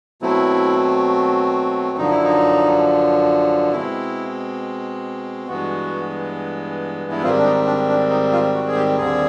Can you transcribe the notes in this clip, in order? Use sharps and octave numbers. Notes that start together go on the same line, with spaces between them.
B2 F#3 A3 C4 E4
F#2 D3 F3 D#4
E4
D#4
B2 G#3 C4 E4
G2 E3 G#3 B3 F#4
E4
G#2 D#3 G3 C4 F4
D4
D#4
D4
D4
D#4
F4
F#4
G#4
G4
D#2 D3 G3 C4 G#4